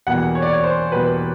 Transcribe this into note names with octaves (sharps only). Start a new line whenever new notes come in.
E2 B2 G3 A#3 F#5
C#5
D5
C#5
C5
E2 B2 G3 A#3 B4